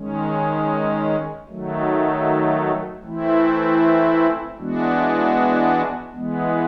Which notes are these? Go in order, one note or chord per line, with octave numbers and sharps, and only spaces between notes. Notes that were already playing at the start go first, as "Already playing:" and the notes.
Already playing: D#3 G#3 C#4
D#3 F#3 A3
E3 A3 C4 E4
E3 G#3 B3 D4 F#4
E3 G#3 B3